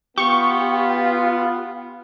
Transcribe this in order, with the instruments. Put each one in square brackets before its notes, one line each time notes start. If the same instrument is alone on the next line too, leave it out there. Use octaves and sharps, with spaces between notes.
[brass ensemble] B3 [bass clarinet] F4 [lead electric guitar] G4 [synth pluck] C#6